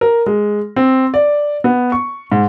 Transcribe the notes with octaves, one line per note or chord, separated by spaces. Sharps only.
A#4
G#3
C4
D5
B3
C#6
G#2